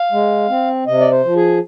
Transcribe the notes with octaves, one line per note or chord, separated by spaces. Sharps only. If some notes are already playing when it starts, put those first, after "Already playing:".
Already playing: F5
G#3
C4
C3 D#5
D5
C5
F3
G#4